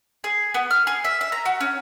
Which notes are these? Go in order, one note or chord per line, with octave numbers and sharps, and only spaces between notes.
G#4
B3
F6
G#4
E5
E5
A#5
F#4
C#4